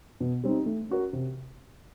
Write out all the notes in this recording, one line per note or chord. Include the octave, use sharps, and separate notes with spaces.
B2
G3 C4 D#4
A3
C#4 F#4 A#4
C3